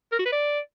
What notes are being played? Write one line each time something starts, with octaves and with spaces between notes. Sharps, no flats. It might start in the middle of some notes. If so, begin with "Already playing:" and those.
A#4
F#4
B4
D5